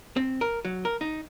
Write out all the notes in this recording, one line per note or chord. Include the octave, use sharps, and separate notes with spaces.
C4
A#4
F#3
A#4
D#4